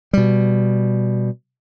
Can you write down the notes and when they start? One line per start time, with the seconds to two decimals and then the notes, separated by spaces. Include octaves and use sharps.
0.13 B2 G3